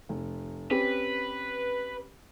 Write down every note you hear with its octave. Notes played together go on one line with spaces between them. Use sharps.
F1
C4 C#4 G4 B4